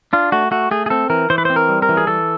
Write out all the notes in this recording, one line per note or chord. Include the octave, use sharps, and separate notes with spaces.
D4 F4
A3 F#4
A3 F#4
A3 G#4
G#4
C4 A4
E3 A#4
E3 C5
B4
C4 C5
A#4
G3
A#4
E3
G#4
E3 A4